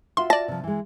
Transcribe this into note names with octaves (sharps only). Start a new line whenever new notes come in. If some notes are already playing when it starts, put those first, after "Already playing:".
F4 F#4 E5 C6
D5 A5 A#6
C3 F3
E3 G#3